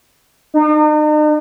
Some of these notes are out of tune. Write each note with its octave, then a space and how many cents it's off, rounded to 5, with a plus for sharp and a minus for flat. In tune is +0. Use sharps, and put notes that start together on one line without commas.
D#4 -45